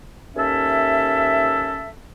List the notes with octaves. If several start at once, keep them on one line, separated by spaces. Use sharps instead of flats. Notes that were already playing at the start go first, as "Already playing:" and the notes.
D#2 C#4 A4 E5